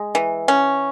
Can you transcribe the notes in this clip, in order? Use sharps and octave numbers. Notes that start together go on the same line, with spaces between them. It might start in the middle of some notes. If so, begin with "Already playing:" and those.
Already playing: G#3
E3
C#4